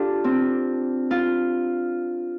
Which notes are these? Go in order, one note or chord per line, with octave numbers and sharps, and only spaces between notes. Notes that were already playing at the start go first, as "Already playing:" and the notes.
Already playing: D4 F4 G4 A4
C4
F4